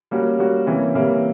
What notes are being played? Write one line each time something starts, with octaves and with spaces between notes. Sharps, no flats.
G3 A#3 C#4 F#4
G3 A#3 C#4 F#4
C3 E3 G3 A#3 C#4
C3 E3 G3 A#3 C#4